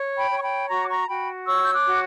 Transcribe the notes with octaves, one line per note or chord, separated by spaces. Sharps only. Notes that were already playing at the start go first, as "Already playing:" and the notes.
Already playing: C#5
G5 B5
C#5
C#6
G5 B5
F#4 A#5 C#6
D6
A#5 C#6
F#4 G5 B5
C#5 C#6 E6
G6
D6 F#6
F#4